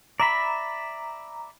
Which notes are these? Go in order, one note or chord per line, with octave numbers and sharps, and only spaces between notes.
D5 E5 A#5 B5